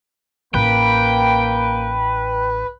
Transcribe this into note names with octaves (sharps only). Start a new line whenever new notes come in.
A1 A#3 B4 G5